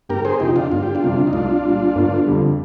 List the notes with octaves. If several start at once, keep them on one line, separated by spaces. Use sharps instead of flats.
G1 G4 A#4
G#4 C5
F2 C3 F3 D#4 G4
D4 F4
G1 F4
G4
D4 F4
F2 C3 G3
D#4
C2 D4 F4
A#2 G3
G1
F2 D3 G3